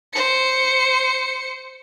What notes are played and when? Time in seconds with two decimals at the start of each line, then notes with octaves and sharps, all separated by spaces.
0.13 C5 C#7